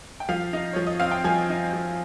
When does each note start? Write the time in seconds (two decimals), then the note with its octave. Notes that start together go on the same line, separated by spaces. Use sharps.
0.20 G5
0.29 F3 F5
0.53 D#4
0.73 F3 C#5
0.87 D#5
1.00 C4 F5
1.12 G5
1.24 F3 G#5
1.49 D#4
1.73 F3